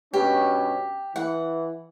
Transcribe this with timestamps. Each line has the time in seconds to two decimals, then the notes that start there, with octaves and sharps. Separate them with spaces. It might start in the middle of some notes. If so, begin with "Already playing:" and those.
0.14 G2 B2 C#4 G4
1.16 E3 F#5